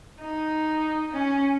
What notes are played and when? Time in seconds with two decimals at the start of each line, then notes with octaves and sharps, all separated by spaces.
0.22 D#4
1.13 C#4